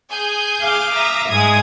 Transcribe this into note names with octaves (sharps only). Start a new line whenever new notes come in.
G#4 G#5 G6
F5 D6
E5 A#5 D#6
G#2 G#3 D#6 G#6